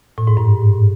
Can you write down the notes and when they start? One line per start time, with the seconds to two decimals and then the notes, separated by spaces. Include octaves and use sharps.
0.18 A2
0.27 G#2
0.37 G2